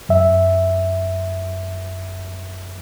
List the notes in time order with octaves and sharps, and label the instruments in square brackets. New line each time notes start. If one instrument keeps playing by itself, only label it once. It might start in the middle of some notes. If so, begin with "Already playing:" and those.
[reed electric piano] F#2 E5